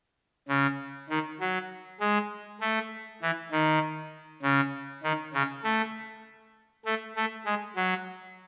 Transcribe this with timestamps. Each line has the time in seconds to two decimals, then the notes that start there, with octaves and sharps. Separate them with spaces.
0.48 C#3
1.10 D#3
1.40 F#3
2.00 G#3
2.60 A3
3.22 E3
3.52 D#3
4.42 C#3
5.03 D#3
5.33 C#3
5.63 A3
6.85 A3
7.16 A3
7.45 G#3
7.76 F#3